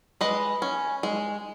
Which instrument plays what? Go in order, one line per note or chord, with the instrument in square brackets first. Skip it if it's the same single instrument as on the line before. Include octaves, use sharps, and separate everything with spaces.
[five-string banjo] G#3 B4 D#5
C#4
G#3